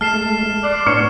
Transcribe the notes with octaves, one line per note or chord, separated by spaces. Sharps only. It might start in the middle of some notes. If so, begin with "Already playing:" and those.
G#3 A3 A5 F6 C7 E7
D5 C6 F#6
A2 B3 D4 C#5 C#6 F6 C#7